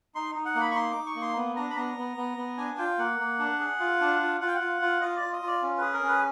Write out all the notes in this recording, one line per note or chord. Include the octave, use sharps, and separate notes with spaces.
D#4 C6
D#4
F#5
A#3
B5
C#6
D#4 C6
D#4 D6
C#6
A#3
C6
B3
D4 A#5
B5
B3 A#5
B3
B3
B3
D4 G#5
F4 G5
A#3 F#5
A#3
D4
G#4
F4
D4
F4
F4 F#5
G5
F#5
F4
F4
F4 D#5
D5
F4
D#5
F4
D5
C#4
G#4 B4
A#4
C#4 B4